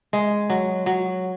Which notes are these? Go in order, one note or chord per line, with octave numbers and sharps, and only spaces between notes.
G#3
F#3
F#3